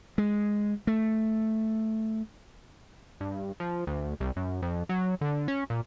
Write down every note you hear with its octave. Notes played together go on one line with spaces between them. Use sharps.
G#3
A3
G2
F3
D2
C2
F#2
F2
F#3
D3
C#4
A#2